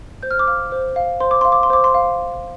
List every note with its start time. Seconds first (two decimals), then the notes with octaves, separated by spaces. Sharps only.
0.23 C5 G6
0.31 F6
0.39 D6
0.47 F5 F6
0.72 C5
0.96 F5
1.20 C5 C6
1.31 D6
1.41 F5 C6
1.52 D6
1.63 C6
1.70 C5 D6
1.84 C6
1.94 F5